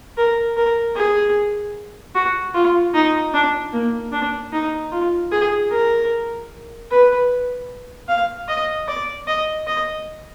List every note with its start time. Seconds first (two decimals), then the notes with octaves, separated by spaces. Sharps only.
0.17 A#4
0.57 A#4
0.96 G#4
2.15 F#4
2.54 F4
2.94 D#4
3.34 D4
3.73 A#3
4.12 D4
4.53 D#4
4.92 F4
5.32 G#4
5.71 A#4
6.90 B4
8.09 F5
8.48 D#5
8.88 D5
9.28 D#5
9.67 D#5